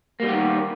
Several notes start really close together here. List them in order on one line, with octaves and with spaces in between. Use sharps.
A#3 G3 B3 G4 D#3